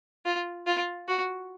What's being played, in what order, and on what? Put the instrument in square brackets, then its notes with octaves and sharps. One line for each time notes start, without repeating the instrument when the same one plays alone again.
[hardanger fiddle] F4
F4
F#4